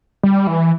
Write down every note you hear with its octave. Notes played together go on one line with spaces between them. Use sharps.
G3
E3